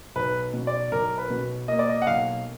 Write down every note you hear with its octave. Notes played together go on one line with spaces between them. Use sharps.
B1 B4
B2
D5
B1 A#4
B4
B2
A#3 D#5
D5
D#5
F#5
B1 F5